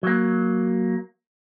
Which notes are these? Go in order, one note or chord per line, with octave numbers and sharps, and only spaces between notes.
F#3 A#3